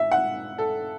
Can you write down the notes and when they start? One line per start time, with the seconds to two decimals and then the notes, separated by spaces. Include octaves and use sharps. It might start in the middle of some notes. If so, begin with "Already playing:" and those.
Already playing: E5
0.11 F#5
0.58 A4